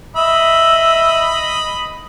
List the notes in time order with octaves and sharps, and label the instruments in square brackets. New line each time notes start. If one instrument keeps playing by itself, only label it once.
[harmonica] D#5 B5 D#6 [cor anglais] E5